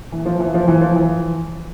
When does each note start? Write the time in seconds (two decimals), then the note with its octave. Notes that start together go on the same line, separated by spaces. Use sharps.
0.12 E3
0.26 F3
0.40 E3
0.54 F3
0.68 E3
0.81 F3
0.96 E3